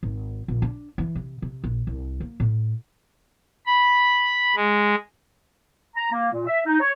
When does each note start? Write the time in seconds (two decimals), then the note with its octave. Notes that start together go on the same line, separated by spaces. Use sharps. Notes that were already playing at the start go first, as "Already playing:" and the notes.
0.03 G#1
0.48 A#1
0.62 D4
0.98 E3
1.15 C3
1.42 C3
1.64 A#1
1.87 C2
2.20 A#3
2.40 A2
3.66 B5
4.56 G#3
5.95 A#5
6.12 A#3
6.32 A#2
6.46 E5
6.66 D#4
6.80 C#5